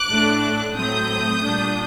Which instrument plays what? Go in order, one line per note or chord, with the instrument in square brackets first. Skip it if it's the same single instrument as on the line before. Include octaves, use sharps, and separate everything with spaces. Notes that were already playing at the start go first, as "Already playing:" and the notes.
Already playing: [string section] D6 F#6
A2 A3 D4
A2 F#3 A3 C4 D#6 G6
A#2 G3 D4